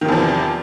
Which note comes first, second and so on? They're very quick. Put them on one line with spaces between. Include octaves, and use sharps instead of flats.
D#3 C3 E2 F3